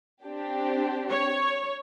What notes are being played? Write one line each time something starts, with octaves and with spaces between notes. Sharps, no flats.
C4 D4 G4
C#5